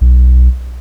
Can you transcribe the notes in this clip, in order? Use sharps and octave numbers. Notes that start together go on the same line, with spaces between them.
B1